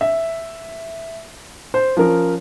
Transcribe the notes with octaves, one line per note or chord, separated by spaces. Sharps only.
E5
C5
F3 C#4 A#4